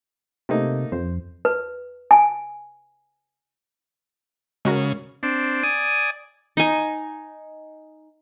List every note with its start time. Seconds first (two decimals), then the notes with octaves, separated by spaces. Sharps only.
0.49 C3 A3 A#3 D#4
0.92 F2 C5
1.45 B4
2.11 G#5
4.65 C#3 G#3 F#4 A#4
5.23 C4 D4
5.63 D5 G#5 D#6
6.57 D#4 G#5